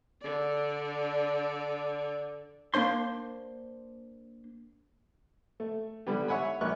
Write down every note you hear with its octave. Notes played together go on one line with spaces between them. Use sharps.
D3 D5
A#3 D4 C5 C6
A3
D3 G3 B3 G4
C#5 E5 F#5 G#5 B5
A#1 A#4 C#6 F#6